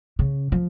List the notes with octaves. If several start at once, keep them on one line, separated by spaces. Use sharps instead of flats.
C#3
F3